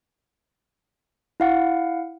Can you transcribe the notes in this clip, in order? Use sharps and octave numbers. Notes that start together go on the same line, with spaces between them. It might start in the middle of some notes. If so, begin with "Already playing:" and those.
E4 F5 F#5